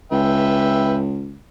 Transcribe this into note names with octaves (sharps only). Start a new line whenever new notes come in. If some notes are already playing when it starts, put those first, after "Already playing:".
C#2 B4 E5 G5